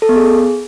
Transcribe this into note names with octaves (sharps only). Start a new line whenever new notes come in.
A4
B3
G#4